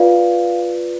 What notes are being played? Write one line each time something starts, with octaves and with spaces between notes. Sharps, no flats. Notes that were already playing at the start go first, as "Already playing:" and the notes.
Already playing: F4 B4 D5 F5